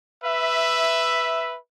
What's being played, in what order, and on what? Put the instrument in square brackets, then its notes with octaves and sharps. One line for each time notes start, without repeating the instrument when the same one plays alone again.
[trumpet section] B4 E5